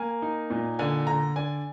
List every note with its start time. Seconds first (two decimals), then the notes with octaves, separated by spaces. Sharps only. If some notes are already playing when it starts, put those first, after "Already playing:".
Already playing: A#3 G#5
0.22 D#4
0.50 A#2
0.79 D3 G#5
1.07 D3 A#5
1.36 D4 G#5